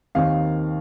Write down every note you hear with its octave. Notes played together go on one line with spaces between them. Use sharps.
D#2 D#3 C4 D#4 F5